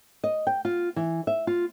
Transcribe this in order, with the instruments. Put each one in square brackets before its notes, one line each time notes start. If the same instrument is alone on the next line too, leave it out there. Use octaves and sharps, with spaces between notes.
[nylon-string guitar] D#5
G5
F4
E3
E5
F4